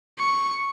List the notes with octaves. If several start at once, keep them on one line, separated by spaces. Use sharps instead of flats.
C#6